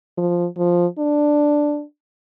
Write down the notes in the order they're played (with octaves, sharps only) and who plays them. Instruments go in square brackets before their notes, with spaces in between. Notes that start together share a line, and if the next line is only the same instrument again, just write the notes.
[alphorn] F3
F3
D4